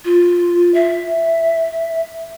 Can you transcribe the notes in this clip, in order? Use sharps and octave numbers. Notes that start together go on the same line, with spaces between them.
F4
E5